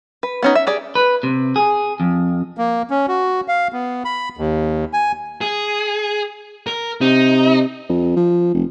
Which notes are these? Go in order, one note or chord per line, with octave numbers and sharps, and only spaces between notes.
B4
B3 C#4 D#4
E5
G4 G#4 D5
B4
C3
G#4
F2
A#3
C#4
F#4
F5
B3
B5
D#2
G#5
G#4
A#4
C3 D#4
F2
F3
F1